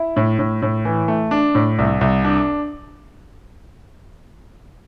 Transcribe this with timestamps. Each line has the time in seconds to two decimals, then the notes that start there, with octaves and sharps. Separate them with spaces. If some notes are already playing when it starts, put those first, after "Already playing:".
Already playing: E4
0.16 A2
0.39 A2
0.62 A2
0.85 E3
1.08 A3
1.31 D4
1.55 A2
1.79 C2
2.01 C2
2.24 D4